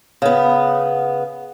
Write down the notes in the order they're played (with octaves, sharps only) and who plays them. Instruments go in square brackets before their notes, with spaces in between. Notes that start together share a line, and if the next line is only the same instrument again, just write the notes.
[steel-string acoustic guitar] C#3 B3